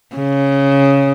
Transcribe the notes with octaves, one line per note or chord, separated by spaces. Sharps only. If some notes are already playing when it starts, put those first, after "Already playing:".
C#3